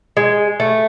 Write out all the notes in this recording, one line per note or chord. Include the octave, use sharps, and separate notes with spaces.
G#3
A3